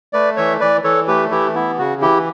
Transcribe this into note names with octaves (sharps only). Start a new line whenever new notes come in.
A3 B4 D5
E3 C#5 E5
E3 B4 D5
E3 A4 C#5
A3 G4 B4
E3 E4 G4
B3 E4
C#3 F#4
E3 E4 G4